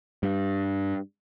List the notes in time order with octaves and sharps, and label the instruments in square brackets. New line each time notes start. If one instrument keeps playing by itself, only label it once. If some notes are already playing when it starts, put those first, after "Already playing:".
[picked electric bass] G2